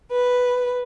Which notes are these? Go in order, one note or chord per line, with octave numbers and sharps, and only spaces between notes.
B4